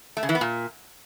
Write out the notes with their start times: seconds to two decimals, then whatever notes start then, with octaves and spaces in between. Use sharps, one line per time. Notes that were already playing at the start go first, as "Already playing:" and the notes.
0.17 A3
0.23 C#3
0.29 E3
0.35 B3
0.41 A#2